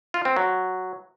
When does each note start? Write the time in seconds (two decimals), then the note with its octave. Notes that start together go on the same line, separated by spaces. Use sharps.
0.14 F4
0.25 C4
0.36 F#3